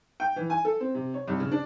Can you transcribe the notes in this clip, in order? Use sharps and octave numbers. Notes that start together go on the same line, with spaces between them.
G5
E3
G#5
A4
C4
C3
C#5
C2
C#3
D4